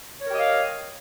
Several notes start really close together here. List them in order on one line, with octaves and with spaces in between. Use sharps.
C#5 A#4 G4 D#5 F5